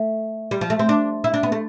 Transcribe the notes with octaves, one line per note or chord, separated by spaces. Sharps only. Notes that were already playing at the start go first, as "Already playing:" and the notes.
Already playing: A3
G3
F3
A3
C4
D4
E4
D4
B3
A3